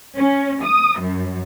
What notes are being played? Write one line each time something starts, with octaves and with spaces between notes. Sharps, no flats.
C#4
D#6
F#2